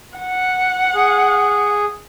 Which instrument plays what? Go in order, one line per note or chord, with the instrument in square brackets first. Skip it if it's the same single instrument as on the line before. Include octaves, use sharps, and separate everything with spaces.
[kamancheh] F#5
[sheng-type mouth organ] G#4